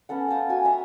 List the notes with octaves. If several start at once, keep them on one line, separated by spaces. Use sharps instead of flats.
B3 C#4 A4 F#5
F5 G5 A5 D#6
F#4 G#5
E5 G#5 A#5